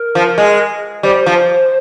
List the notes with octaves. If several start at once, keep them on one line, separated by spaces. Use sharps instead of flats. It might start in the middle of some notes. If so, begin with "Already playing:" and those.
Already playing: A#4
F3
G#3
G3 C5
F3